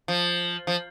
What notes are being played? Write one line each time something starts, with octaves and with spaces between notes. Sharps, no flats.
F3
F3